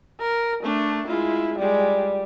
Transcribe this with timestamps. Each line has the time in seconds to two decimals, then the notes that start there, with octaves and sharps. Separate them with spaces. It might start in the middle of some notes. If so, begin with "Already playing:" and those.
0.21 A#4
0.64 A3 D4
1.08 G#3 E4 F4
1.59 G3 G#3